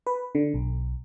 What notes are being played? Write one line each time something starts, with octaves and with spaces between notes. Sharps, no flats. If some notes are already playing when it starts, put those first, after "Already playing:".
B4
D3
B1